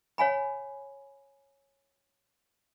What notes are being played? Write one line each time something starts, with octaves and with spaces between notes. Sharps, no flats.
C#5 F5 G#5 B5